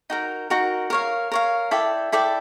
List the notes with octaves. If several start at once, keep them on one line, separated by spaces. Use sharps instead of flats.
D#4 F#4 A#4
D#4 F#4 A#4
A#4 C#5 F5
A#4 C#5 F5
E4 A4 D5 G5
E4 A4 D5 G5